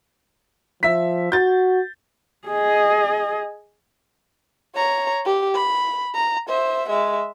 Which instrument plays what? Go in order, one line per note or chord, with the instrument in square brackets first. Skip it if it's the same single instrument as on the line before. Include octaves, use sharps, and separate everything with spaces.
[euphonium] F3 [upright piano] E5 B6
[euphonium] F#4 [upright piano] G6 A6
[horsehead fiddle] G#4 D#5
[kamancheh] C#5 A#5
G4
B5
A#5
C5 E5
G#3 E5